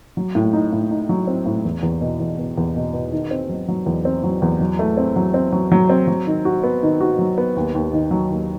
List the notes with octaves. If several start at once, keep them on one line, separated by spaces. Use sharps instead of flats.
F#3
A2
D#4
A2
D#4
F#3
C4
A2
E2
E2
B2
E2
B2
E2
B2
B2
D#3
C4
F#3
F#3
E2
C4
F#3
E2
F#3
A3
C4
F#3
C4
F#3
F#3
C4
F#3
D#3
F#4
B3
D#3
F#4
F#3
B3
D#2
D#2
D#3
F#3
D#2